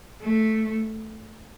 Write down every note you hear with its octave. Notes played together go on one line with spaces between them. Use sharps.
A3